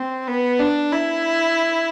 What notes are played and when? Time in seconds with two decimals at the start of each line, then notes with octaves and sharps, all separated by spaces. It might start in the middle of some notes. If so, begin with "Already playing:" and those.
Already playing: C4
0.27 B3
0.60 D4
0.92 E4